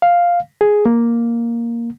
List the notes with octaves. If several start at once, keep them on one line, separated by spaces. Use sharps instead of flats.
F5
G#4
A#3